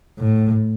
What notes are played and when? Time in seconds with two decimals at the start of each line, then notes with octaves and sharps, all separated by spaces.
0.19 A2